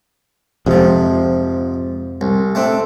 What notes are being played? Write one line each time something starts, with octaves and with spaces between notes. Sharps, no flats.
F2 G#2 C3 F3
C2
A3 C4 D4